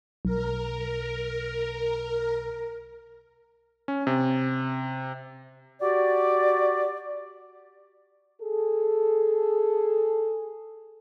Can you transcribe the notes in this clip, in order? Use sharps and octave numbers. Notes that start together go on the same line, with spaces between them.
B1 A#4
C#4
C3
F#4 G4 D5
G#4 A4